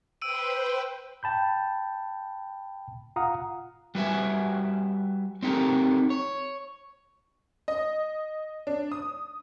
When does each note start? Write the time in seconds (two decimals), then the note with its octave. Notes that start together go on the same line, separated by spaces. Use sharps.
0.22 B4 C5 G5 E6 D7 D#7
1.23 G5 A5 B5 G6
3.16 F4 F5 F#5 A#5 D#6
3.95 G3 F#4 B4 E5 G#5
5.43 C4 D#4 G4 A4 A#4
6.10 C#5
7.68 D#5
8.67 D4
8.92 D#6